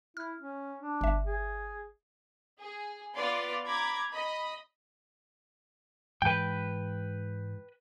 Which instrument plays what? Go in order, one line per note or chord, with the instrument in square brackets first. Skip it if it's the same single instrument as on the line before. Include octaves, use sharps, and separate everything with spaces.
[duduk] E4 [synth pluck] F6
[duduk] C#4
D4
[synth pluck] G1 E5
[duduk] G#4
[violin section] G#4
B3 F4 B4 D5 C6
A#5 B5 D6 G#6
D#5 B5
[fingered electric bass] G#2 E3 G#3 [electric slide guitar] B4 G5